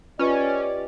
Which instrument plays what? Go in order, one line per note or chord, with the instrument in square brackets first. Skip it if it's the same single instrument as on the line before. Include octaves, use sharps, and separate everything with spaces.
[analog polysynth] C#4 [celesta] F4 B4 D#5 [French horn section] G4 D5